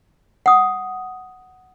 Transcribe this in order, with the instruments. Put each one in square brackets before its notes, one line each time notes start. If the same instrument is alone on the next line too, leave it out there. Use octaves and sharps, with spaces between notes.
[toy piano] F#5 D#6